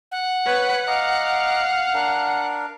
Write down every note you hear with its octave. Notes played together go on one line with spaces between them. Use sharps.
F#5
B4 C#5
D#5 F5 A#5 D6
D4 A#4